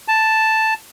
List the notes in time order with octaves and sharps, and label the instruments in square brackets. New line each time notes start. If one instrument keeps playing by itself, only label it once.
[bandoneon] A5